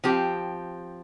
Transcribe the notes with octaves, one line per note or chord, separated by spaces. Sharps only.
F3 C4 G4